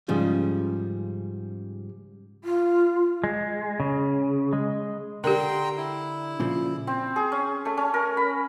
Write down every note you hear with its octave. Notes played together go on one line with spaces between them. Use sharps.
G#2 C#3 F3 G3
F4
G#3
C#3
G#3
D3 G4 A#4 G5 A#5 C6
E4
A#2 C#3 F3
C4
G#4
C#4
A3
C#4
A#4
B5